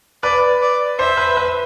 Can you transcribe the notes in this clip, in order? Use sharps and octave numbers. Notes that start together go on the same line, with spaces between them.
B4 D5
D5
C5 E5
B4
B4